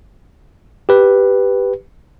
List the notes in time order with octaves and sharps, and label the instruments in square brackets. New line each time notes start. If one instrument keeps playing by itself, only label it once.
[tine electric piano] G4 B4